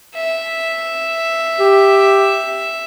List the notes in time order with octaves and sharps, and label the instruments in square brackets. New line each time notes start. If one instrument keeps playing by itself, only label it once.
[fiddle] E5
[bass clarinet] G4